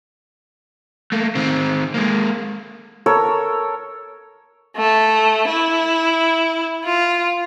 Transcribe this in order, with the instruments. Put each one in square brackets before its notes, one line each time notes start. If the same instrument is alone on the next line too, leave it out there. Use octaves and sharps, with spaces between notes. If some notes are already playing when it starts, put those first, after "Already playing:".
[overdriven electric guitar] A3 A#3
D#3 C4
G#3 A#3
[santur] A4 A#4 C#5
[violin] A3
E4
F4